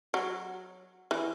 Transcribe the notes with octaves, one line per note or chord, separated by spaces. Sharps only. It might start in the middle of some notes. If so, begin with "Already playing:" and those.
F#3
E3